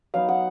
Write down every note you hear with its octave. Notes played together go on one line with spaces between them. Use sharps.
F#3 B3 D#4 F5
F#5